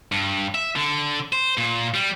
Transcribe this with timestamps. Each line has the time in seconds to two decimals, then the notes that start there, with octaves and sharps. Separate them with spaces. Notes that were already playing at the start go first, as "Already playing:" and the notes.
0.12 G2
0.55 E5
0.76 D3
1.33 C5
1.58 A#2
1.94 G3